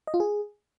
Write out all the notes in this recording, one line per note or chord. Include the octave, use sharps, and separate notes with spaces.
D#5
F4
G#4